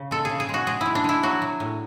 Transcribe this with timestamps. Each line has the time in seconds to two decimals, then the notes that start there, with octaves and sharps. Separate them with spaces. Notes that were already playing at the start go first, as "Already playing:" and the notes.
Already playing: C#3
0.11 G#3 A4
0.25 C#3 G#4
0.40 G#4
0.49 G#3 F#4
0.67 G#3 G#4
0.81 G#3 E4
0.95 D4
1.04 G#3 E4
1.23 F#3 F#4
1.42 F#3
1.60 A2